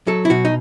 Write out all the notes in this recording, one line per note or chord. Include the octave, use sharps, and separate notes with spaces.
F#3 A4
E4
B2 F#4
D#4